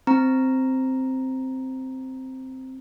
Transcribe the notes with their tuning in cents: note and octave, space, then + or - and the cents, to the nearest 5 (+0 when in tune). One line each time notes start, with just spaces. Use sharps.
C4 +0 A#5 +0